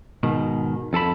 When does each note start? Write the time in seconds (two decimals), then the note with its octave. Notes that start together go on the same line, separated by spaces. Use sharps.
0.23 G#2 B2 D#3
0.93 F2 A4 A5 B5